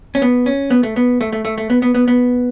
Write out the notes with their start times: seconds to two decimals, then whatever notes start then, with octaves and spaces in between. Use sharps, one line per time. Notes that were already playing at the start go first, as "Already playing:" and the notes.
0.15 C#4
0.22 B3
0.46 C#4
0.70 B3
0.83 A3
0.96 B3
1.21 A3
1.33 A3
1.45 A3
1.58 A3
1.70 B3
1.82 B3
1.95 B3
2.08 B3